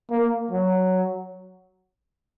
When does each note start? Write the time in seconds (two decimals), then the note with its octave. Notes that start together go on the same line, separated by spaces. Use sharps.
0.11 A#3
0.51 F#3